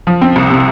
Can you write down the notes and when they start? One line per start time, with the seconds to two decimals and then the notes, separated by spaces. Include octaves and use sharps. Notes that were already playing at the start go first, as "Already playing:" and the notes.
0.07 F3
0.22 C4
0.36 C2
0.50 C3